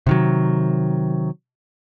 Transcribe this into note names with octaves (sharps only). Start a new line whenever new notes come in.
C3 D#3 F#3